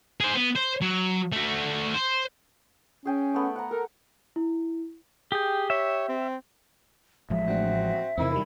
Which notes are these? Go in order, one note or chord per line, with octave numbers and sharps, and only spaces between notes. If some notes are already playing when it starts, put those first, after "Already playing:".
G#4 C5
B3
C5
F#3
A3 F#4
C5
C#4 G#4 G5 G#5
A3 B3
F#5 A#5
A4 A#4
E4
G4 G#4 G5
C#5 E5
C4
A1 F3 G#3 E5
A2 C4 D4 F#4
E2 C3 D#3 C4 E4
D#3 G3 B5